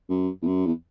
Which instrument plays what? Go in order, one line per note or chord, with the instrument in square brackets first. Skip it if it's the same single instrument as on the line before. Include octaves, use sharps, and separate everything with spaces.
[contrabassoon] F#2
E2
F#2
E2